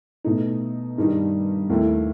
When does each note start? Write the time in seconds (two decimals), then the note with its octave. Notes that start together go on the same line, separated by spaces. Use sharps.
0.24 B2 A3 D#4
0.98 G2 D#3 G3 D#4
1.70 D#2 D#3 A3 E4